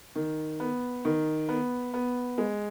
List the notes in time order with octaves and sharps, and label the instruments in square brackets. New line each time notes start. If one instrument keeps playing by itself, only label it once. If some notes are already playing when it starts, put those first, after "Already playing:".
[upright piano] D#3
B3
D#3
B3
B3
G#3